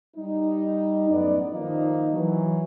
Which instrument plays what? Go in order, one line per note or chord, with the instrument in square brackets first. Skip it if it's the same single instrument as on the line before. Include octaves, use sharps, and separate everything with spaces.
[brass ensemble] G3 D#4
F#2 A2 B3 D#4 D5
D#3 F3 A#3 D#4
E3 F#3